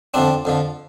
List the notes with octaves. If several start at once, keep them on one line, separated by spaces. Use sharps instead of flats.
F2 D3 F3 C4 D4
F2 D3 F3